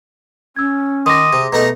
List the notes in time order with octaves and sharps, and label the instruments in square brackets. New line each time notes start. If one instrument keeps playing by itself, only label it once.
[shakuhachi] C#4 [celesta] E6 G#6
[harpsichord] D#3 [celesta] C6 D6 A#6 [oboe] D#6
[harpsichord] C3 [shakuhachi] G#4
[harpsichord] B2 A3 D#4 [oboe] A#5